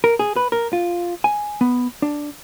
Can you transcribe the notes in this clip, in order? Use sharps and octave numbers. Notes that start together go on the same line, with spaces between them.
A#4
G#4
B4
A#4
F4
G#5
B3
D4